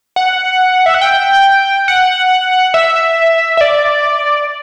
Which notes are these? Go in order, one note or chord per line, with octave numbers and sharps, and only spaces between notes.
F#5
E5
F#5
G5
F#5
E5
E5
D5